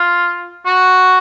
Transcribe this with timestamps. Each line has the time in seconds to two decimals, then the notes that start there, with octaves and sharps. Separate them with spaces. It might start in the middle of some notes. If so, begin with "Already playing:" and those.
Already playing: F4
0.66 F#4